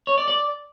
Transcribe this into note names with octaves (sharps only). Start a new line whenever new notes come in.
C#5
D5
D5